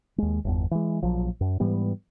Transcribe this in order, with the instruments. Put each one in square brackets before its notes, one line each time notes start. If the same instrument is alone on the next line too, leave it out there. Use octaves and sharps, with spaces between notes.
[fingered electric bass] D#2 G#3
G1 E2
E3 G#3
A#1 F3 F#3
F#2
G#2 E3 G3 B3